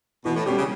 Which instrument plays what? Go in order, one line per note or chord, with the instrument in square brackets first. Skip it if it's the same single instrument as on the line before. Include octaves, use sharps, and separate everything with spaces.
[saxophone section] B2 [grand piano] E3
[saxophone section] A2
[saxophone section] B2 [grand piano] G3 C#4 G4
[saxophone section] C#3